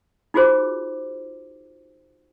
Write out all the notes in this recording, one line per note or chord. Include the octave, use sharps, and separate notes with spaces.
D#4 F4 F#4 G#4 C5 D6